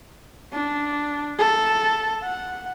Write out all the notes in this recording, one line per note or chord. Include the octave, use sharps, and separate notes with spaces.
D4
A4
F#5